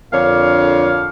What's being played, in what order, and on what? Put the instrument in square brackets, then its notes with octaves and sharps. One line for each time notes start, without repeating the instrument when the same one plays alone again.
[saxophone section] F2 D3 A#3 D4 C#5 F5